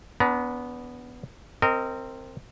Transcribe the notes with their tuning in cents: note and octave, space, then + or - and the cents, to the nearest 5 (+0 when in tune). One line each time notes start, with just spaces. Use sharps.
B3 +0 D4 -35 A#5 +25
C4 +0 A#4 -25 D#5 +0